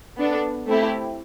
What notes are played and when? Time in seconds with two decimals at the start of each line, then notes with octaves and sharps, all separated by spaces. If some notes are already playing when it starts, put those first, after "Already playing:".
0.17 B3 D4 A4
0.67 A3 C4 E4 G4